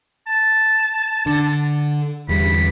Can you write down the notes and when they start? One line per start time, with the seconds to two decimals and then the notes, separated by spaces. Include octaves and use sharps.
0.27 A5
1.26 D3
2.29 G1 E2 G3 B5